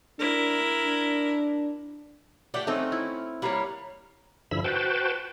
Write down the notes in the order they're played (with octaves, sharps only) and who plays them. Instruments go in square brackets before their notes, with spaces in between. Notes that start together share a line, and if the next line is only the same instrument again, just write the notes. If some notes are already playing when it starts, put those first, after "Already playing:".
[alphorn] D4 [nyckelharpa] E4 A#4
[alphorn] D4
[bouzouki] A3 D4 G4 [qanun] F#5 G5
[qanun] A3 C4 D#4 [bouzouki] C#4
[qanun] E4
[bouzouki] G3 A#3 A#4 [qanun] C#5 F#5
[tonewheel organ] G2 D3 F3 E4 B5 E6
F#4 B4 C5 G5 A5